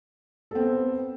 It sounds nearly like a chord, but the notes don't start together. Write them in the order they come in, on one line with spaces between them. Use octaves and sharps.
A4 C4 B3